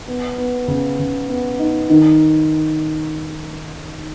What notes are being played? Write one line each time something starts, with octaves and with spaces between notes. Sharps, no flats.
B3
B3
C#3
C#3
B3
D#4
D#3